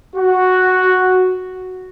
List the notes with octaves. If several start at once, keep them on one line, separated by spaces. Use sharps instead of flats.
F#4